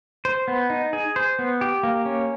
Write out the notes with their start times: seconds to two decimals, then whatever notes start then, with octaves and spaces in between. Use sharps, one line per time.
0.25 C5
0.48 B3
0.70 D#4
0.93 G#4
1.16 C5
1.39 B3
1.61 G4
1.83 A#3
2.06 C#4